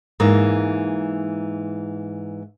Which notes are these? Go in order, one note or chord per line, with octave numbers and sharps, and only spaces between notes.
G#2 E3 A#3